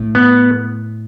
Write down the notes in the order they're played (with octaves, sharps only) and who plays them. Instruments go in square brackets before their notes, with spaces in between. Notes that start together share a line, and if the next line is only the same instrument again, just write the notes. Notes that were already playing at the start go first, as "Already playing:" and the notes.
Already playing: [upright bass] A2
[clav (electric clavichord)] B3